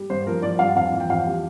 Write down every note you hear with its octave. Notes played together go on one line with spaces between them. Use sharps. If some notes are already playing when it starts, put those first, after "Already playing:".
Already playing: G3
G2 C5
F3 A#4
F3 D5
G2 F5
F2 F5
E3
G5
F2 F5
G3